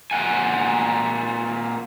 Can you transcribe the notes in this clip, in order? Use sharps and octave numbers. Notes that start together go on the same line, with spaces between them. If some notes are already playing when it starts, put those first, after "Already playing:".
A#2 G#3 F#5 G#5